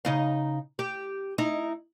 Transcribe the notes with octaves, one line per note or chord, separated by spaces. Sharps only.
C#3 D#4 F5
G4
D#4 E4